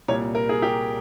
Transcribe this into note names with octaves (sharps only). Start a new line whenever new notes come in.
C2 A#2 G3 A#3 C#5
A#4
G#4
G4